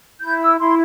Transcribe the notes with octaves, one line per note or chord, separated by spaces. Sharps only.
E4 G6
E6
E4 C6